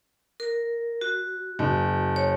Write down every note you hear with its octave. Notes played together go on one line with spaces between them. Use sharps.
A#4
F#4
F#1
C#5